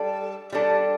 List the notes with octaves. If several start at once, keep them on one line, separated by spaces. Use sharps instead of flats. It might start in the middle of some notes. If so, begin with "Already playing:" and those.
Already playing: G3 D4 A4
G3 D4 A4